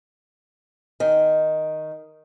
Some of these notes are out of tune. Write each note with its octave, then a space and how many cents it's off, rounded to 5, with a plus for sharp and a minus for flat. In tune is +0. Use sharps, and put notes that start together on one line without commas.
D#3 +0